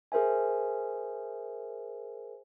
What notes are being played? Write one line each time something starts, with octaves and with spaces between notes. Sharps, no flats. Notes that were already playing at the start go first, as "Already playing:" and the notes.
G#4 A#4 C5 E5 G#5